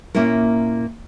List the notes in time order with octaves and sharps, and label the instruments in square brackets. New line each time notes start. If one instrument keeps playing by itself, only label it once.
[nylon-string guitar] A#2 A#3 C#4 E4 A#4